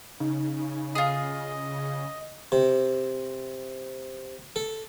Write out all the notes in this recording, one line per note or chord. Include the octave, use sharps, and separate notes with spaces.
C#3 D#4
F4 G#4 D#5 D#6
C3
A4